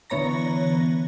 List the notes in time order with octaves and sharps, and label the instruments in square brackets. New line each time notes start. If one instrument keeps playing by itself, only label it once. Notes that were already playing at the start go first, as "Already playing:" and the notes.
[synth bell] D3 E3 B3 C#5 A#5 A#6